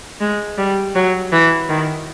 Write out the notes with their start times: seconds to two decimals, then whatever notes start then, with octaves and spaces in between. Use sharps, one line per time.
0.21 G#3
0.58 G3
0.95 F#3
1.32 E3
1.69 D#3